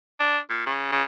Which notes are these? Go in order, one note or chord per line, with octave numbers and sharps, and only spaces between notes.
D4
A#2
C#3
C#3